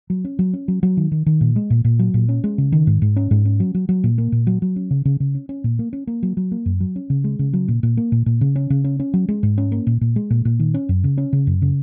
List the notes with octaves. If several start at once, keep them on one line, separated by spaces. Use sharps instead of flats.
F#3
C#4
F#3
C#4
F#3
F#3
D#3
D#3
D#3
A#2
G#3
A#2
A#2
F#3
A#2
C#4
G#3
C#3
D#3
G#2
G#2
C#4
G#2
C#4
F#3
F#3
F#3
A#2
A#3
A#2
F#3
F#3
C#4
C#3
C#3
C#3
C#4
C#4
A#2
A#3
C#4
A#3
F#3
F#3
A#3
F#2
F#3
C#4
C#3
G#3
C#3
F#3
A#2
A#2
A#3
A#2
A#2
C#3
C#4
C#3
C#4
C#4
F#3
G#3
G#2
C#4
A#3
A#2
A#2
G#3
A#2
A#2
D#3
C#4
F#2
C#3
C#4
C#3
F#2
C#3